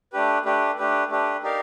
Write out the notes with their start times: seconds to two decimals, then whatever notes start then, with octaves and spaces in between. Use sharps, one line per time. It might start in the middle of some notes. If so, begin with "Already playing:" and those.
0.13 A3 D4 G4 B4
0.45 A3 D4 G4 B4
0.77 A3 D4 G4 B4
1.10 A3 D4 G4 B4
1.43 D#4 G4 A#4 D5 F5